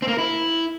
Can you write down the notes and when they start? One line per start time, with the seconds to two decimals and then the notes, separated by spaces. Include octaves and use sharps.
0.02 C4
0.08 A#3
0.13 A#4
0.18 E4